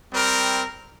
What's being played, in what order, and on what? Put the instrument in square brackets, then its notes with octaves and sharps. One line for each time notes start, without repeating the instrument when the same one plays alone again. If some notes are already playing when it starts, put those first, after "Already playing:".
[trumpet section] G3 C4 A#4